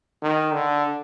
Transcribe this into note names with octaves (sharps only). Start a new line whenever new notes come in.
D#3
D3